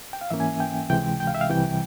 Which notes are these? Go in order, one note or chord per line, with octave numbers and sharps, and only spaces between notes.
G5
F5
G#2 E3 A#3 C#4 E5
G#5
G5
C#2 C3 E3 G#3 G5
G5
F5
E5
F5
C2 C3 E3 G3 G5